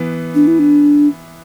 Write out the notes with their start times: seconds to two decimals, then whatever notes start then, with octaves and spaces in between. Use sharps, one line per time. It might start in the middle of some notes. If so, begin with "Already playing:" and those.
Already playing: E3 B3
0.35 D4
0.47 E4
0.59 D4